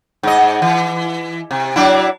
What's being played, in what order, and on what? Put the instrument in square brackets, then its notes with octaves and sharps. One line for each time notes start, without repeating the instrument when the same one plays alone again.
[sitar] G#2 D#5
E3
C3
F#3 D4 E4